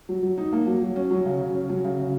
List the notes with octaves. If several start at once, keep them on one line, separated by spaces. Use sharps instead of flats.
F#3
F#3
D#4
A#3
F#3
F#3
C#4
F#3
C#3
C#3
C#4
F#3
C#3
C#3